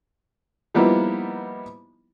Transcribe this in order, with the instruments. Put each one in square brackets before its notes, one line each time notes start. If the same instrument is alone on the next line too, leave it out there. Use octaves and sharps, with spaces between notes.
[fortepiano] F3 G3 A#3 B3 D#4 E4